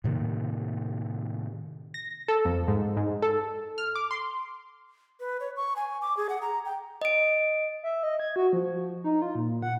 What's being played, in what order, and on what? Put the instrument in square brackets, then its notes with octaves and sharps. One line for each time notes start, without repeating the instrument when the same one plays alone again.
[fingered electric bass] A2 C3 D#3 A#3
[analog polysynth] A#6
A4
F2
G#2
G#2
A4
F6
D6
C6
[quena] B4
C#5
C#6
G#5
D6
G#4
F#5
A#5
G5
[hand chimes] D#5 D7
[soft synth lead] E5
D#5
G#6
F#4
F3
D#4
F4
A#2
F#5